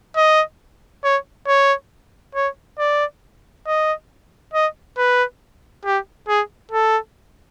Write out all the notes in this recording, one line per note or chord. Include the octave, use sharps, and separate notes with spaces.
D#5
C#5
C#5
C#5
D5
D#5
D#5
B4
G4
G#4
A4